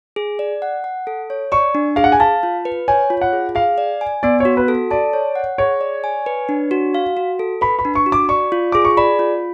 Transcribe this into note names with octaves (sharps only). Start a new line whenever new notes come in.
G#4
D5
F#5
F#5
A4
C#5
D5 C#6
D4
G#4 F5
F#5
G#5
F5 A5
F4
B4
C#5 G#5
F4
F#5
G#4
G#4 F5
D5
G#5
B3 D5
F#4 C#5
B4
A4
D5 A5
C#5
F#5
G#4 C#5
D5
G#5
B4
D4
F#4
F5
F#4
A4
B4 B5
B5
D4
C#6
F#4
D6
D5 C#6
F4
G#4 D6
C#6
D5 B5
F4